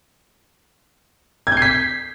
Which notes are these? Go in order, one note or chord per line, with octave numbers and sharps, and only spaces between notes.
G#6
G6
C7
B6